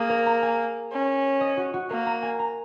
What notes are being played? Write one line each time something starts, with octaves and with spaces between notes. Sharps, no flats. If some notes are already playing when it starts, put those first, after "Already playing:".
Already playing: A#3 G#4
A#4
A#5
G#5
C#4
D#5
F#4
F#4
A#3 A#4
A#5
G#5
A#5